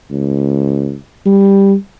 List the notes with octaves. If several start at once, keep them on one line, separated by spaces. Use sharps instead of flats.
C#2
G3